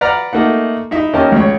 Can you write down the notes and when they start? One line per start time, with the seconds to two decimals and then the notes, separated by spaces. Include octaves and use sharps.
0.01 B4 D5 F#5 A#5 F6
0.33 A3 A#3 D#4 F#5
0.91 D#4 E4 E5
1.13 D#2 C#4 A#4 D#5 G5 A5
1.32 C#2 C#5